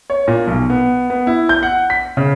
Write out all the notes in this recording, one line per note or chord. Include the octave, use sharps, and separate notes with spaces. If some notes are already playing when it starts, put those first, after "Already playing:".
C#5
A#2
B1
B3
B3
E4
G6
F#5
B6
C#3